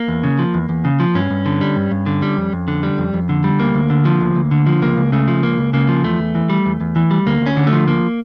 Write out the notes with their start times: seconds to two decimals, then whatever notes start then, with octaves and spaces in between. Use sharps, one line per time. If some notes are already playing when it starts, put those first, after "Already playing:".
Already playing: A#3
0.08 E2
0.24 C#3
0.39 F3
0.54 E2
0.69 E2
0.85 C#3
1.00 F3
1.15 G2 C#4
1.30 G2
1.46 D3
1.61 G3
1.76 G2
1.91 G2
2.06 D3
2.22 G3
2.37 F2
2.53 F2
2.68 D3
2.83 G3
2.98 F2
3.14 F2
3.29 D3
3.44 G3
3.59 D2 A#3
3.74 D2
3.90 D3
4.05 F3
4.20 D2
4.36 D2
4.51 D3
4.67 F3
4.82 C#2 A#3
4.97 C#2
5.12 C#3 A3
5.28 F3
5.43 C#2 A#3
5.58 C#2
5.73 C#3 A#3
5.89 F3
6.04 E2 A3
6.19 E2
6.35 E3
6.49 G3
6.66 E2
6.81 E2
6.96 E3
7.11 G3
7.26 D2 A#3
7.41 D2
7.46 C#4
7.57 D3
7.67 A3
7.72 F3
7.87 D2 A#3